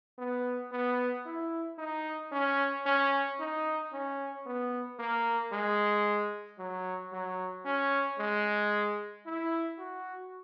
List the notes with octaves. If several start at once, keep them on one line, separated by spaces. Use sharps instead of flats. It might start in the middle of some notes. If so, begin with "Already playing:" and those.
B3
B3
E4
D#4
C#4
C#4
D#4
C#4
B3
A#3
G#3
F#3
F#3
C#4
G#3
E4
F#4